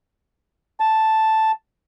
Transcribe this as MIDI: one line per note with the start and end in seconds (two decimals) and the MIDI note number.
0.80 1.51 81